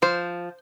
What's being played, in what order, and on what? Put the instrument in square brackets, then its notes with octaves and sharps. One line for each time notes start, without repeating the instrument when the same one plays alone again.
[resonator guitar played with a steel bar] F3 [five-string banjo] C5